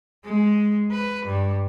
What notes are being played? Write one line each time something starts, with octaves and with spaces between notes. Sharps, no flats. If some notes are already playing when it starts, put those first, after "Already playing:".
G#3
B4
G2